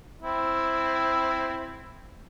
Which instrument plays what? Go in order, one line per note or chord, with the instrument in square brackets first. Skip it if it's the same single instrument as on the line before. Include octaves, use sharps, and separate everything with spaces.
[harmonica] C4 E4